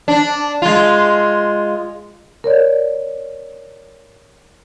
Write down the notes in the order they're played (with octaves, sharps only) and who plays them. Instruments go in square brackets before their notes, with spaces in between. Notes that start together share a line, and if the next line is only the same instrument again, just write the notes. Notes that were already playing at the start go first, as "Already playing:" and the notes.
[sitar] D4
G#3 F4
[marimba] A#4 C#5 D5